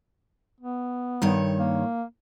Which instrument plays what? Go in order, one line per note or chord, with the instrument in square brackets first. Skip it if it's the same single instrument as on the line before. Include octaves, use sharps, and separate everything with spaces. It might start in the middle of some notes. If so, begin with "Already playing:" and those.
[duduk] B3
[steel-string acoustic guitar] G2 D#3 C#5
[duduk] A#3